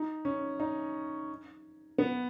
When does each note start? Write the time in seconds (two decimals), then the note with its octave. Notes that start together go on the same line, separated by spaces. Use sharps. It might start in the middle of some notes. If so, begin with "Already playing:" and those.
Already playing: D#4
0.25 C#4
0.60 D#4
1.98 B3